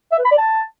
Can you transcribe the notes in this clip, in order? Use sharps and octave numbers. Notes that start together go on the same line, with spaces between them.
E5
B4
B5
D5
A5